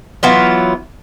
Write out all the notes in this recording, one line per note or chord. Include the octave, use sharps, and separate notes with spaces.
E3 F#3 B3 F4